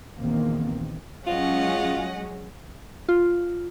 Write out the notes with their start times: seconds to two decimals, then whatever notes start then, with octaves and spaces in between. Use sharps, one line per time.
0.18 A#1 E2 D#3 A#3 C4
1.27 F#3 G#3 C#4 F4 D#5 F#5
3.09 F4